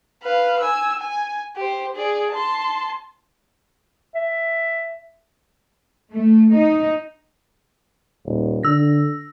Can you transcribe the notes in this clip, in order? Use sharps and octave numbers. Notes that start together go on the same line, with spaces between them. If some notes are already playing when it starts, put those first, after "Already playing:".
B4 F5
G#5 E6
G#5
G4 C5
G#4 D5
A5 C6
E5
A3
D#4
D#1
D3 E6 A#6